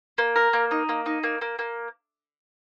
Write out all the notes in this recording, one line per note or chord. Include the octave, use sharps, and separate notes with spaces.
A#3
A#4
A#3
D#4
A#3
D#4
A#3
A#3
A#3